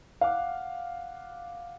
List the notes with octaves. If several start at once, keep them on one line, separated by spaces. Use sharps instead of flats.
F5 F#5 D6